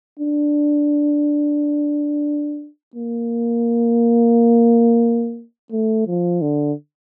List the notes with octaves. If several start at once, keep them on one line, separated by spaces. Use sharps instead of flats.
D4
A#3
A3
F3
D3